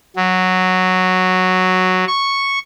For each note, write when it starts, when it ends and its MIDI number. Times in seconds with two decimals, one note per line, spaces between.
0.17 2.05 54
2.07 2.59 85